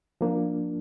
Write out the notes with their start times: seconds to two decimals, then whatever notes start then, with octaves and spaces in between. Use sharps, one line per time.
0.21 F3 A#3 D4